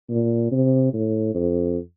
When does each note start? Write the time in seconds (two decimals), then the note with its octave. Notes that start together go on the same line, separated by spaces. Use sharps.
0.10 A#2
0.51 C3
0.93 A2
1.34 F2